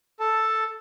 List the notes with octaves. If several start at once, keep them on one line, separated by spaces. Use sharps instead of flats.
A4 A5